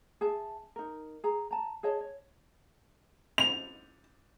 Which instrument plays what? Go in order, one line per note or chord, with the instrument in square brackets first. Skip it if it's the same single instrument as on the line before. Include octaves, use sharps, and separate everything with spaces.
[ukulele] G#4 E5 A5
D#4 A#4
G#4 A#5
A5 A#5
G#4 C#5 D#5 A5
C#5
[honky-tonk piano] F7